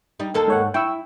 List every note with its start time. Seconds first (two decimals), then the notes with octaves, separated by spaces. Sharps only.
0.20 G3 D#4
0.34 D#2 A#3 A4
0.48 G#2 C#5 F#5
0.74 E4 G5 C#6 E6